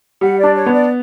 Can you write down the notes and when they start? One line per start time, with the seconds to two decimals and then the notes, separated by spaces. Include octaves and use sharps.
0.21 G3 F#5
0.38 D5
0.44 D4
0.54 C#5
0.66 B3
0.72 D5